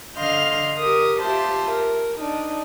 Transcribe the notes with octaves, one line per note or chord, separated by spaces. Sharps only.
D3 D#5 F5 C6 F6 G6
G4 A#4 D#6
F4 G4 C5 E5 A5
A#4
D4 D#4